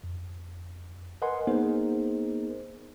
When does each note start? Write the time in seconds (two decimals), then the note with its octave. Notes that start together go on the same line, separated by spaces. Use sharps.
0.04 F2
1.22 A#4 B4 D#5 F#5 G#5 C6
1.47 A#3 B3 D#4 G#4 A#4 C5